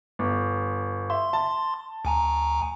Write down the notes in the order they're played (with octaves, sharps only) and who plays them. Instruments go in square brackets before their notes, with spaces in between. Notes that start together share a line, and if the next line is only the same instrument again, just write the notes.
[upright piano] G1
[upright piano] E5 [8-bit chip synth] C6
[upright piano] A5
[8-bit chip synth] D2 G#5 A#5